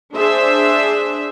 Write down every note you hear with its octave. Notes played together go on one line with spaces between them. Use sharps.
D4 G#4 C5 E5